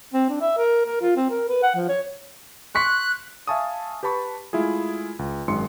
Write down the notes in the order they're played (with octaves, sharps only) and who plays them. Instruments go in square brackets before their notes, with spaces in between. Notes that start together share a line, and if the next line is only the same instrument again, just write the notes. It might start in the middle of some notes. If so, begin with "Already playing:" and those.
[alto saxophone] C4
D4
E5
A#4
A#4
F4
C4
A#4
B4
F#5
F3
C#5
[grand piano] C6 C#6 B6 [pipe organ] F#6
[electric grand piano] E5 F5 G#5 A5 C#6 D#6
G4 B4 A5 B5 C#6
G#3 A3 E4 F4 G#4
C#2
G#1 F#2 D#3 G#3 C6 C#7